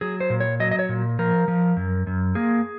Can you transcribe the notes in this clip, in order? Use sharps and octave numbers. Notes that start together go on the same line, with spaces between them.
F#3 G#4
C5
A#2
C#5
F#3 D#5
D#5
C#5
A#2
F3 A#4
F3
F#2
F#2
A#3 G#4